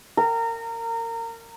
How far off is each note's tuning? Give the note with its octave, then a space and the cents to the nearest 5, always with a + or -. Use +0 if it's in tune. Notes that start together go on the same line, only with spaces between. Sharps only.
A#4 -25